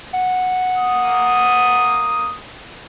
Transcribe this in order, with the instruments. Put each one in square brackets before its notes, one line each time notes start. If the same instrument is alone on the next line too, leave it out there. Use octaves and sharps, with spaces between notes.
[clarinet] F#5
[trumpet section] A#3 D#6